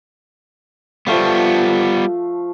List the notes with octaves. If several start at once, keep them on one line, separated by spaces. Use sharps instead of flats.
F3 G3 A3 B3 F5